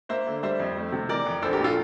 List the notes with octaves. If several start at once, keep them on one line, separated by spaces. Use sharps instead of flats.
A#3 C5 E5
D3
G3 C5 E5
F2
A3
C3
E3 A#4 D5
F2
A#1 A4 C5
G4 A#4
A#2
F4 A4